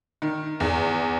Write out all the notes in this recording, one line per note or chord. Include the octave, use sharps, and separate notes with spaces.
D#3
E2